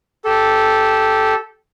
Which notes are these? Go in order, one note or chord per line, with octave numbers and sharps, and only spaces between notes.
G4 A4